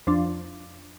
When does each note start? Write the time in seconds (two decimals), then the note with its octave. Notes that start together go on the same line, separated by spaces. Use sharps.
0.07 F2 F3 D4